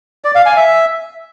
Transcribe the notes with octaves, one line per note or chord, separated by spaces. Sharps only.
D5
F5
G#5
E5